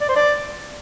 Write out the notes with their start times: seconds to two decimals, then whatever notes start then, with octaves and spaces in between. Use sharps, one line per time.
0.01 D5
0.09 C5
0.16 D5